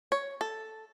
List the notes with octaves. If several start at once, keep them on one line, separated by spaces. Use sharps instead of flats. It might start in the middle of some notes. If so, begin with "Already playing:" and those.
C#5
A4